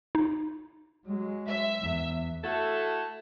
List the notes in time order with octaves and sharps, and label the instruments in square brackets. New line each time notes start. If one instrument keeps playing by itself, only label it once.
[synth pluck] D#4
[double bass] F#3 G#3
[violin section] E5
[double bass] E2
[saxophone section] A3 E4 F#4 A4